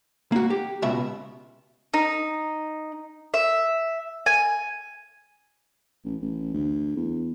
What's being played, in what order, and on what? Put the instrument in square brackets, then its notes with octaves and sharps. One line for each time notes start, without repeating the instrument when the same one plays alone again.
[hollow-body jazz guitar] A#3 F#4
G4
C#2 B2 E5
[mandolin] D#4
E5
G#5
[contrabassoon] A1
A1
D2
E2